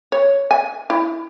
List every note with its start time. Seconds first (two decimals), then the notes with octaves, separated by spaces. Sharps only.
0.12 C#5
0.51 G#5
0.90 E4